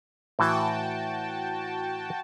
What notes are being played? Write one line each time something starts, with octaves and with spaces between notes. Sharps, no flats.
A2 E3 F#4 G5 A5